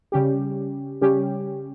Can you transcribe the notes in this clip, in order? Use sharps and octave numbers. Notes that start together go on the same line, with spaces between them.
C#3 G3 C#4 G4
C#3 G3 C#4 G4